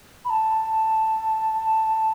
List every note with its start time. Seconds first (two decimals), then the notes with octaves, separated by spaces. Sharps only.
0.25 B5
0.30 A5